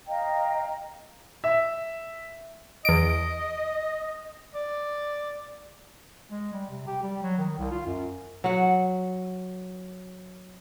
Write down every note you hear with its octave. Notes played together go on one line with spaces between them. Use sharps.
D#5 F5 G5 A#5
E5
E2 D#5 D7
D5
G#3
G3
C3
G4
G3
F#3
D#3
C2
F4
F#2
F#3 F#5